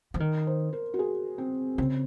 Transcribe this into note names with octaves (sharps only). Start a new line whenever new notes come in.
F3
D#3 A#4
C5
A#4
F#4
G#4
C4
C#3 C4